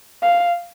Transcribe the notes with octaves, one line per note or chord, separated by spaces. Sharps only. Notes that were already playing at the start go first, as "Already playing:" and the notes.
F5